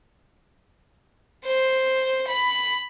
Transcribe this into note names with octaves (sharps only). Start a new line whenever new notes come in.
C5
B5